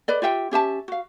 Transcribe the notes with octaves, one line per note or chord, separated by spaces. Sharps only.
B4 D5 D#5
F4 G4 E5 G5
C#4 G4 E5 A5
F#4 F5